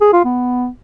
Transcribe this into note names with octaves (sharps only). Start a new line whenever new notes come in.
G#4
F4
B3